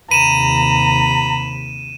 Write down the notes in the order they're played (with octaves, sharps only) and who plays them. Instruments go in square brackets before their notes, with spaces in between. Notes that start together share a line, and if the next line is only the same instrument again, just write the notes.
[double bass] D#2 C3 [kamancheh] A#5 [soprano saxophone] B5 [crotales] D#7 E7